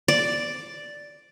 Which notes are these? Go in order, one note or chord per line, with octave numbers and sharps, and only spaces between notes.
D5